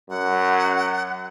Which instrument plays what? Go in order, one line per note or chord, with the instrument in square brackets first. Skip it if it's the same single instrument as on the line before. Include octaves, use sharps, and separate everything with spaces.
[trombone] F#2 [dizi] F#5